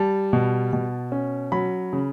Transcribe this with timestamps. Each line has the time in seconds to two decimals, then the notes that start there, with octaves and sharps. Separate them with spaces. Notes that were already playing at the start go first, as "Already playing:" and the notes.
Already playing: G3 A5
0.33 B2
0.73 B2
1.12 C#4
1.52 F#3 B5
1.93 C#3